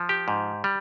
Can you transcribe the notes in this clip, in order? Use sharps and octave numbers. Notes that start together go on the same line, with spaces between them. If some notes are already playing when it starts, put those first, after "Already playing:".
Already playing: F3
G4
G#2
G3